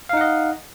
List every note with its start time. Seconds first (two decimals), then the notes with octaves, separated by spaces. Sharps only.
0.09 F5
0.13 D#4
0.17 F#5
0.21 D#5